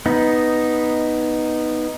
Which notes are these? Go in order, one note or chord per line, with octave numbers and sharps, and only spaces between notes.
B3 D#4